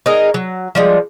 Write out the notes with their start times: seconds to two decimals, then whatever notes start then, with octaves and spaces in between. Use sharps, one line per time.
0.06 D#4 G#4 A#4 D#5
0.34 F#3
0.75 F3 G3 G#3